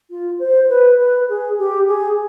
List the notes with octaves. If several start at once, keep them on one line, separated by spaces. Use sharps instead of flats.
F4
C5
B4
B4
G#4
G4
G#4